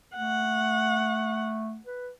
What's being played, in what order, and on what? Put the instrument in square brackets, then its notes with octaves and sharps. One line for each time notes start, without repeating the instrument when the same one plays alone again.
[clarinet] A3 [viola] F#5
[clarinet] B4